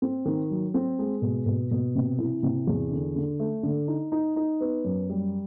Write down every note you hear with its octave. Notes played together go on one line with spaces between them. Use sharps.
C4
D#3
F#3
C4
G#3
B2
B2
B2
C3
E3
C3
E2
D3
D3
A3
D3
D#4
D#4
D#4
B3
F#2
G3